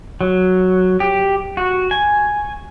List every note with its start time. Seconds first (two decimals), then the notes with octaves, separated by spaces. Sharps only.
0.21 F#3
1.00 G4
1.57 F#4
1.91 G#5